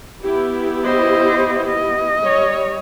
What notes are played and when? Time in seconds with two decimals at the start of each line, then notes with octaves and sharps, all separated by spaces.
0.23 B3 E4 G4
0.85 C5 D#5
1.67 D#5
2.23 G3 C#5